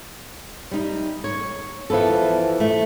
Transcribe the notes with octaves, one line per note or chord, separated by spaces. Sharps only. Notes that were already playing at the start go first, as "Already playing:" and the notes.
G3 D#4
C#5
E3 F3 B3 A4
A3